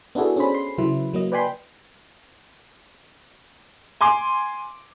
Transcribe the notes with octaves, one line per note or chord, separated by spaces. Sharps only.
B3 D4 E4 F#4 G#4 A4
C#4 D4 G#4 C5 B5
C6
C#3 F#3 E4 B4
F#3 A#3 D#5
B4 D5 G5 G#5 B5 C6
G#5 C6 D6